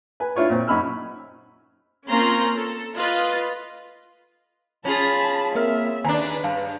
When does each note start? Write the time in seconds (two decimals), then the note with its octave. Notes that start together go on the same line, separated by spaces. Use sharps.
0.20 B4 G#5
0.35 D4 E4 F4 C#5 D5
0.50 A#2 C4
0.67 F#2 C#4 D#4 B5 E6 F6
2.07 A#3 C4 C#4 F4 A#5 C6
2.54 A4
2.96 F4 B4 D#5
4.85 C#4 F4 G#4 A5 B5
5.55 A#3 C4 A#4 E5 F6
6.04 D#2 D4 B4 G#5 A#5
6.44 G2 F5 A5